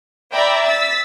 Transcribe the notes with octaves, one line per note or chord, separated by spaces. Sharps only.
D5 E5 G5 A#5 B5
E6 A6 B6